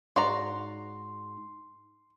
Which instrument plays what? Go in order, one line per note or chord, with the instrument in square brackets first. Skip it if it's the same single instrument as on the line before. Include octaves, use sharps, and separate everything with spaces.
[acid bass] G#2 [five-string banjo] F#4 D5 A#5 [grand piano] C6